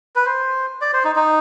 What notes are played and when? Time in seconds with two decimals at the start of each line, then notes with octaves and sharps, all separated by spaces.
0.16 B4
0.26 C5
0.81 D5
0.93 C5
1.04 D#4
1.16 D#4